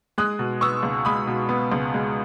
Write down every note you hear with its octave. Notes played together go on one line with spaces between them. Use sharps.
G#3 D#6 F#6
B2
B3 C#6 E6
C#2
G#3 B5 D#6
B2
B3
C#2
G#3